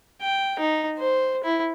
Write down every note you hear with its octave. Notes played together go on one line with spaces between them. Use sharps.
G5
D#4
C5
E4